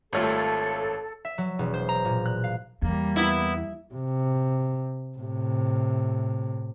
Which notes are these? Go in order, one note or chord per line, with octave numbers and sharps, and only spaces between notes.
G#1 G3 A3 F4 A4 C#5
E5
F#3
E1
C5
A#5
A#2
F#6
F5
E2 G3 A#3
B3 E4
C3
A2 C3